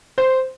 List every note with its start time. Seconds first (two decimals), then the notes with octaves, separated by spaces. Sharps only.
0.18 C5